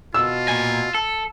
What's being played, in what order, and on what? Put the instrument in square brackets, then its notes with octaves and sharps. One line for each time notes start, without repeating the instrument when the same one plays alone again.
[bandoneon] B2 [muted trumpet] F4 [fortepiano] E6
[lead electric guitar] A#2 G#5
A4